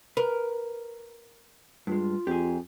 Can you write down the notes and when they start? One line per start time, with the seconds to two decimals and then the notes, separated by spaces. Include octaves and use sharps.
0.17 A#4 B4
1.87 G2 G#3 F4
2.27 F2 G4 G#4